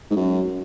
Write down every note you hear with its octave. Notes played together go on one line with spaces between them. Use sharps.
G#2
F#2